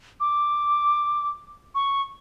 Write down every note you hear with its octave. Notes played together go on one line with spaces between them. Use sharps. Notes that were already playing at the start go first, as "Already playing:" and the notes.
D6
C#6